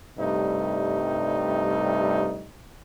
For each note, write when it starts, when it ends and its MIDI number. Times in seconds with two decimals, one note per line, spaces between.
0.18 2.50 43
0.18 2.50 48
0.18 2.50 55
0.18 2.50 57
0.18 2.50 63